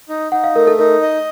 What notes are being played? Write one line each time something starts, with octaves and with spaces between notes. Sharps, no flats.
D#4
D#4 F#5
F5
A3 A#4
A4
D#4 A#4
D#5